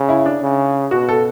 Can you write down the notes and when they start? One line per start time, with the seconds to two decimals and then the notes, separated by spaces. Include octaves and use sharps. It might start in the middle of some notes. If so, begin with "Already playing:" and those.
Already playing: C#3
0.09 E4
0.26 D4
0.42 C#3
0.91 B2 F#4
1.09 A4